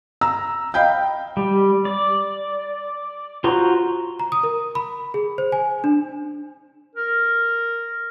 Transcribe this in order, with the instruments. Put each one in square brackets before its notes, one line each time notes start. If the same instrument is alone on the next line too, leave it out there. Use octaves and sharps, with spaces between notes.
[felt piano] A#5 E6
D#5 F5 G5 B5 G6
[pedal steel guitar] G3
D5
F4 F#4 C5 A#5 C6
[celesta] A#5
D#6
A#4
B5
G#4
C5
G#5
D4
[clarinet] A#4